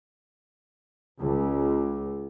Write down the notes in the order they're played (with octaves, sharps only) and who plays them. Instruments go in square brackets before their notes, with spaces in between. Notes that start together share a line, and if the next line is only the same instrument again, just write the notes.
[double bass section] C#2